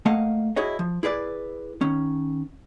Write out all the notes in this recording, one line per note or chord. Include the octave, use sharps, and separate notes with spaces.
A3 A#3 D#5 F5 F#5
E4 F#4 G#4 C#5 D#5
F3
E4 G#4 B4 D5
D#3 C#4